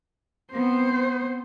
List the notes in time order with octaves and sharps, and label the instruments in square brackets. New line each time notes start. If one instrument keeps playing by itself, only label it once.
[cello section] B3 C4 [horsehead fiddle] C5